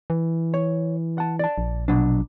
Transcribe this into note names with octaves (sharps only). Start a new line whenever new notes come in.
E3
C#5
F#5 A5
D5 A5
A#1
B2 F#3 D4